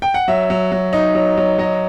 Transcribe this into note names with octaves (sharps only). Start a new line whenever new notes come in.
G5
F#5
F#3 E5
F#3
F#3
D#4
F#3
F#3
F#3 D#5